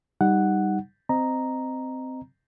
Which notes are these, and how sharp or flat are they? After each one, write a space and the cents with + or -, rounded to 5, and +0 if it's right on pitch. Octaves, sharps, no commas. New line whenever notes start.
G3 +0 D#4 +0 F#5 +0
C4 -15 D#5 -5 A#5 +0